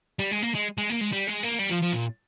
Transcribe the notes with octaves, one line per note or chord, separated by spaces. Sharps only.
G3
G#3
A#3
G#3
G#3
A#3
G#3
G3
G#3
A#3
G3
F3
F3
A#2